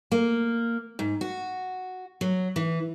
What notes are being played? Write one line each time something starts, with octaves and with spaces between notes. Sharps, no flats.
A#3
G#2
F#4
F#3
E3